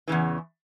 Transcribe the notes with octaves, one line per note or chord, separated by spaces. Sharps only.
E2 C#3 E3